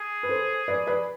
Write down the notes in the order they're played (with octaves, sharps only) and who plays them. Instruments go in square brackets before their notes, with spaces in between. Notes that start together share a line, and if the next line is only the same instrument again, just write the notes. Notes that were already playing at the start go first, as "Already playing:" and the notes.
Already playing: [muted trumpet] G#4
[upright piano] B4
A4 C5
B4 D5
B4 D5